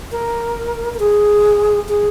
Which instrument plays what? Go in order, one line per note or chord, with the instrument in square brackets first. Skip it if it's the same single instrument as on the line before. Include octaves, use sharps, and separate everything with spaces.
[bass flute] A#4
A#4
G#4
G#4